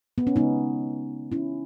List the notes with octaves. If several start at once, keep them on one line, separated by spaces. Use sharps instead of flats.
B3
C#4
C#3 G#3 B3 D#4
C#4 E4